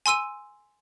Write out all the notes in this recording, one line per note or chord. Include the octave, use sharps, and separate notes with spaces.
G#5 C6 E6 D#7